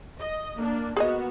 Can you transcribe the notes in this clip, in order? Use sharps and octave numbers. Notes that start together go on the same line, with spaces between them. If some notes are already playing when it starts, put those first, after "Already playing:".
D#5
A#3 D4
A#3 B3 F#4 G#4 C#5 D#5